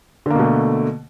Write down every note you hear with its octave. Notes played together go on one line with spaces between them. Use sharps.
B2 D3 A3 A#3